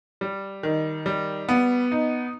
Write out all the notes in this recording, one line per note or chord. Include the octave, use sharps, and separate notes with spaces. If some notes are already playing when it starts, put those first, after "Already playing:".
G3
D#3
G3
B3
D#4